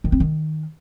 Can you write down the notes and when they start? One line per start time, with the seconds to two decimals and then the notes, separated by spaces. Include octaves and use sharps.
0.04 D#3
0.12 C4
0.20 D#3